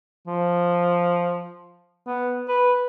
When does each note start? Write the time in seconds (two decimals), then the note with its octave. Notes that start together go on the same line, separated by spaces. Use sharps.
0.27 F3
2.07 B3
2.48 B4